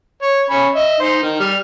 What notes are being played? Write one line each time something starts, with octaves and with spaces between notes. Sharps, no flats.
C#5
C#4 C#5 B5
D#5 E5
D#4 C5
D#3
G3 F6